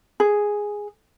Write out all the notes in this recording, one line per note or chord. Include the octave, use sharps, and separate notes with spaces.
G#4